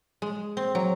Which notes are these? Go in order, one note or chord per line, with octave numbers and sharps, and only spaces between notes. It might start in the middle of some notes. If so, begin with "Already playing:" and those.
G#3
C4
F#3